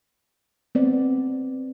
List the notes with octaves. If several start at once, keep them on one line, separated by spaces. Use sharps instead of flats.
B3 C4 D5